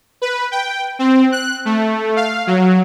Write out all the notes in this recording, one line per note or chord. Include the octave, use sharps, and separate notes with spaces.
B4
G5
C4
F#6
A3
F5
F#3